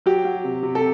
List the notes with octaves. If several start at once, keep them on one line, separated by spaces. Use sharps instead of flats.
F#3 G4
F#3
C3
C3
A4